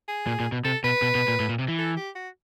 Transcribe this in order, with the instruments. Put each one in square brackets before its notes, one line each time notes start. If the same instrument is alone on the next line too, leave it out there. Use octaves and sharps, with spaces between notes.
[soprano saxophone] G#4
[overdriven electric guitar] A#2
A#2
B2
[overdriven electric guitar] C3 [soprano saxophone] A4
[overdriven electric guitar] B2 [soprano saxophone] B4
[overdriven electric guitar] B2
B2
A#2
A2
A#2
C3
E3
[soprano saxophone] A4
G4
F#4